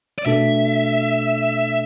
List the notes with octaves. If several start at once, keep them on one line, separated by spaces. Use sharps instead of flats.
D5
B2 A3 D4 A4 E5